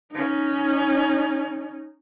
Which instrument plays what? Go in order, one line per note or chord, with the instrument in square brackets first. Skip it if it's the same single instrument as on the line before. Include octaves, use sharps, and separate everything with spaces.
[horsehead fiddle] C#4 D#4